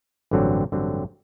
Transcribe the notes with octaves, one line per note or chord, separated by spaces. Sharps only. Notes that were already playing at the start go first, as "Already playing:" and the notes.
A1 G2 D3 F#3 C4
A1 G2 D3 F#3 C4